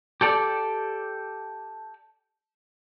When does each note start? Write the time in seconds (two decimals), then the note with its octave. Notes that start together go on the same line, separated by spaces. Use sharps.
0.21 G4 A4 D5